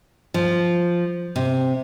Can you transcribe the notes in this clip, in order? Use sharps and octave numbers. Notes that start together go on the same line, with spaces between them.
F3
C3